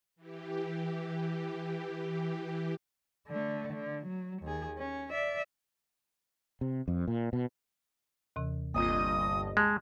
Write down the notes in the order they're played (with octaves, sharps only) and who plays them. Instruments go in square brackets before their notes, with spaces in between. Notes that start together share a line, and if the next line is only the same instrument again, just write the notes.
[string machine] E3 G4
[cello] D3 A3
D3
F#3
D#2 G#4
C#4
D5 E5
[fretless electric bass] C3
F2
A#2
B2
[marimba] D#2 C3 E3
[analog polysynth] G1 G2 D#5 [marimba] A#3 C4 F4 [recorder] D#6
[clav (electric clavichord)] G#3 [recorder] A5